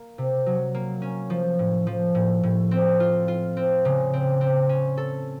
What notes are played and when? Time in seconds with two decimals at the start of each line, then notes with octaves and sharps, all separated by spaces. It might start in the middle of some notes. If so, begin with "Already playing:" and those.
Already playing: A#3
0.18 C3
0.46 F#3
0.74 A#3
1.02 C#4
1.30 F3
1.59 A2
1.87 F3
2.15 A2
2.43 A2
2.71 C4
3.00 F4
3.28 F4
3.57 C4
3.85 C#3
4.13 C4
4.41 C4
4.69 C#4
4.97 A4